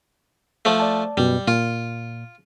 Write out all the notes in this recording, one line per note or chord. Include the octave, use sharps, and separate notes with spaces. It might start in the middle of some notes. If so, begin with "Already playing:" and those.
F3 A3
D5 A5
F#2 B2 G3
A#2 F4